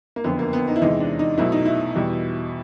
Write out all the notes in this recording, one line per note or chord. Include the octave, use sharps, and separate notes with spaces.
A#3
F#1 F2 D3 B3
A#3
B3
D#4
E4
E2 C3 E3 G#3 D#4
D4
D#4
B1 B2 F#3 A3 E4
D#4
E4
E2 B2 G3